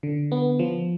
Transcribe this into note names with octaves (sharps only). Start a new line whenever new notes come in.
D3
B3
F3